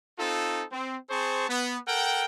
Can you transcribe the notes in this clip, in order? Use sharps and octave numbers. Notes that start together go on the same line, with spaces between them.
C4 D#4 F4 A4
C4
C4 G#4 C5 A5 C#6
B3
A4 A#4 F#5 G5